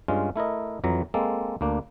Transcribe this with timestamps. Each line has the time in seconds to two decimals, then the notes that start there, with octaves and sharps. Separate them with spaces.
0.08 G2 G#3 C#4 F4
0.36 A3 E4 A#4 D#5
0.84 F2 E3 F#3 A#5
1.14 G#3 A#3 C4 A4
1.61 D2 A#3 D4